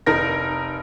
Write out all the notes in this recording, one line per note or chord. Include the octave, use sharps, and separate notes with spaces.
F1 D#4 A#4 A#6